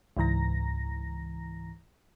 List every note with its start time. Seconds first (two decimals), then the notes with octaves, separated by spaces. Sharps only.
0.17 C#2 G#2 E3 A#5 A#6